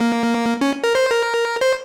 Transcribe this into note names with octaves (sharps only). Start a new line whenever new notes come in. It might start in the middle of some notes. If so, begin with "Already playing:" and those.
Already playing: A#3
C#4
A#4
C5
A#4
C5